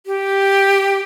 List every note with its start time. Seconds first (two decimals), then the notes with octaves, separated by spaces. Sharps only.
0.06 G4